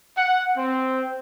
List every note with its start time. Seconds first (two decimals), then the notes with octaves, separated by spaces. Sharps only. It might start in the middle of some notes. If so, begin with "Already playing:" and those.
0.18 F#5
0.57 C4